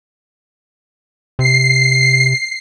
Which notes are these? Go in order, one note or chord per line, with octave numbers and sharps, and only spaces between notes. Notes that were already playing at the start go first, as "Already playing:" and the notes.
C3 C7